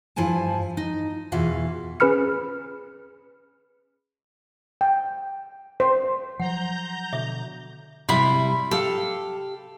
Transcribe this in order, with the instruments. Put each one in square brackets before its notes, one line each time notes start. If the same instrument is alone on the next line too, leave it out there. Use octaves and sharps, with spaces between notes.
[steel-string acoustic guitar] G2 F3 E4 G#5 A5
D#4
E2 B2 E3 F4 F5
[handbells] C#4 G#4 B4 B5 F6 C#7
[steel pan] G5
C5
[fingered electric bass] F3 F#3 [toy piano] F#5 [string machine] A#5 G6
[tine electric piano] B2 D3 [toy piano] E5
[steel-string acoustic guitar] C3 G3 [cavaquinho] E4 B5 C6
[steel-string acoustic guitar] G4 F5 [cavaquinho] A4